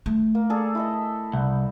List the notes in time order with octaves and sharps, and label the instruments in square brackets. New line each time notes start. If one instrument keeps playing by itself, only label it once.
[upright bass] A3
[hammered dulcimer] A#3
G#4 A4 D5
E4 A4 D#5
[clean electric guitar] C2